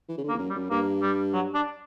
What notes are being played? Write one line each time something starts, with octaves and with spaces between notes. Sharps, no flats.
E3
C#3
D3
A#3
E2
F#2
G3
F#2
G2 A#3
G3
F#3
D4